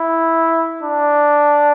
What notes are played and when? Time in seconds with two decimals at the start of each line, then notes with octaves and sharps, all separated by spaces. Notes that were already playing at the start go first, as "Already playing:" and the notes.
Already playing: E4
0.83 D4